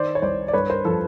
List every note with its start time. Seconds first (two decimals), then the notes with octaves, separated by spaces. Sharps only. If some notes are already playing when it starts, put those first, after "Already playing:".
Already playing: D#3 C5 D5
0.15 C#5
0.22 C2 C5 D5
0.48 D5
0.53 G2 B4 C#5
0.69 A#4 C5
0.85 F3 A4